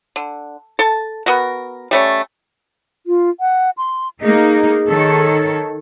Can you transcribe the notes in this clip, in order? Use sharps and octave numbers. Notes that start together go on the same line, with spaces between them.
D3
A4 A5
B3 F#4 A#4
G3 A3 C#4
F4
F#5
C6
A#3 D#4 G#4
D#3 A4 C#5